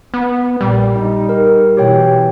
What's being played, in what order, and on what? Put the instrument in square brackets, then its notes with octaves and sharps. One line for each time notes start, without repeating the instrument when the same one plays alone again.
[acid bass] B3
[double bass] A#1 A#2 [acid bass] G3
[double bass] D#4
[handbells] A#4
[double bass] B2 E3 [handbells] G4 C#5 G5